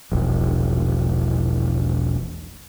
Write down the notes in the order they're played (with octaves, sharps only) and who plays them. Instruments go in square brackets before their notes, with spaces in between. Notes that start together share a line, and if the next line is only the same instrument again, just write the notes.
[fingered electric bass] E1 A#1